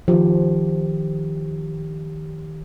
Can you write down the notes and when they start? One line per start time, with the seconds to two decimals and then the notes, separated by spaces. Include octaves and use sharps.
0.08 D#3 F3 G4